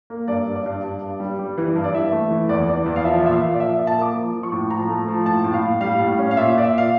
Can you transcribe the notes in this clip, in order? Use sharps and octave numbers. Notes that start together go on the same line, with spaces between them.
A#3
G2 D5
G2
D5
G2
G2
G2
G3
G3
E3
G2
D5
E3 E5
A3
E3
E2 D5
E3 D5
E2
F5
F3 E5
A#2 E5
F5
A#2
D5
F3 E5
E5
A#2
A5
A#3 D6
F3
F3
C#6
A2
F3 A#5
A3
F3
A2 A5
A2
F5
A2
G3 F5
A2
C#4
F5
A#2 E5
A#2 D5
E5
A#2 F5